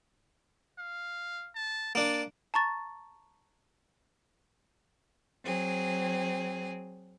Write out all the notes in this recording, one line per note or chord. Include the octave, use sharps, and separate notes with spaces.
F5
A5
A#3 D4 D5
A5 A#5 C#6 A6
F#3 C4 G#4